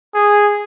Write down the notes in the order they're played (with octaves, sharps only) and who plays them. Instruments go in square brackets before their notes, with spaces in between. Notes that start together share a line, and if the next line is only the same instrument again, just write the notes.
[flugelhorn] G#4